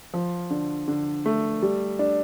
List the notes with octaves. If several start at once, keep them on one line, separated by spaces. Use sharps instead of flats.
F3
D3
D3
A3
G3
D4